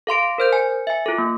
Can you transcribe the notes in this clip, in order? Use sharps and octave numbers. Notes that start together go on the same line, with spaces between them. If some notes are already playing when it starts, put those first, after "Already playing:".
A4 F5 C6 D7
A#4 C5 G6
G#5
E5 G#5
F4 A4
A#3